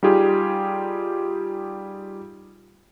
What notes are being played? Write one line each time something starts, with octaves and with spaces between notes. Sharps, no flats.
G3 D#4 F4 G4 G#4